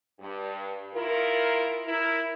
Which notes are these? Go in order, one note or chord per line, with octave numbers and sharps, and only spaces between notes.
G2
D#3 E4 F4 A#4
E4 A#4